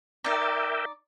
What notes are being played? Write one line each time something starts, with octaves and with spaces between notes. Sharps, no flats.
D#4 A#4 D5 E5 G5